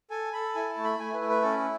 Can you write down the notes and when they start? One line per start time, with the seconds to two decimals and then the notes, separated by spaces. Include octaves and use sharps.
0.10 A4 G#5
0.33 A4 B5
0.55 E4 G#5
0.69 A5
0.77 A3
0.84 B5
0.99 A3 G#5
1.14 B4
1.21 E4
1.29 B4
1.42 C#4 A4